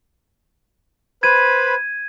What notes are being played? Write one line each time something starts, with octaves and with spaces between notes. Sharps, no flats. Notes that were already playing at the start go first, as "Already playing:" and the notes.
B4 C5 B5 G#6 D#7